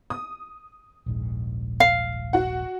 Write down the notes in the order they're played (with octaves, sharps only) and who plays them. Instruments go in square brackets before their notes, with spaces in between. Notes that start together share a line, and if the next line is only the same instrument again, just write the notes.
[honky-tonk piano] D#6
[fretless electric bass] D#1 A#1 G#2
[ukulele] F5
[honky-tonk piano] F#4 F#5